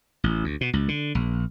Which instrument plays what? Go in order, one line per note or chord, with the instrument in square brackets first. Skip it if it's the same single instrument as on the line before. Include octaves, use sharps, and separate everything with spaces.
[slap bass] A1
D2
B2
C#2
D3
A#1